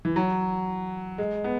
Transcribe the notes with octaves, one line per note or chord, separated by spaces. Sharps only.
E3
F#3
G#3
B3